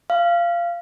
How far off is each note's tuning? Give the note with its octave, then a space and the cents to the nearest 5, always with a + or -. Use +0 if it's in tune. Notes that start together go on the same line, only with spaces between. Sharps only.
F5 -20